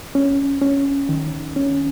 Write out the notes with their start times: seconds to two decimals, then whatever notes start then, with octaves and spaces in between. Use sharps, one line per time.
0.15 C#4
0.62 C#4
1.09 D#3
1.56 C#4